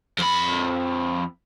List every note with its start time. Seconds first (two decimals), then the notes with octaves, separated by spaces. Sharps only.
0.18 F2 B5